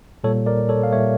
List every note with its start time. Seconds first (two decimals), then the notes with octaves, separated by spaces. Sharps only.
0.24 A#2 G3 A#3 A4 C#5
0.46 A#4 D5
0.69 A4 C#5
0.83 F5
0.92 A#2 G3 A#3 C#5 E5